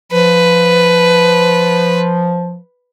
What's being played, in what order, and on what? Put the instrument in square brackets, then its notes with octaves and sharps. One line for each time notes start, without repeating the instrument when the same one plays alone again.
[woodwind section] F3 [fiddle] B4